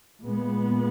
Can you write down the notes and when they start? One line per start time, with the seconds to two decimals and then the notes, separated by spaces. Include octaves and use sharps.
0.21 A#2 G#3 B3